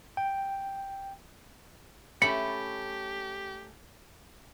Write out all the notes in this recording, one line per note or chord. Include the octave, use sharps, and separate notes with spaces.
G5
A3 C#4 G4 B5 C#7